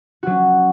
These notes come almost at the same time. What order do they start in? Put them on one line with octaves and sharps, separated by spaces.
F#4 F#3 C#4